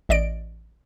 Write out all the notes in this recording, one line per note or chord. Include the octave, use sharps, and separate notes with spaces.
A1 D5 D#5 D7